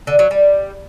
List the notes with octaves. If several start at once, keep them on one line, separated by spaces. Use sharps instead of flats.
D3
F#3
G3